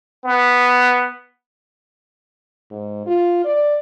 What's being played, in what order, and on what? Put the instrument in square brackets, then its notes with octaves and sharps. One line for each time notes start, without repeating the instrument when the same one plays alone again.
[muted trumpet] B3
[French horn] G#2
F4
D5